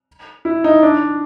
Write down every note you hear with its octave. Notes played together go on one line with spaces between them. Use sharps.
E4
D#4
D4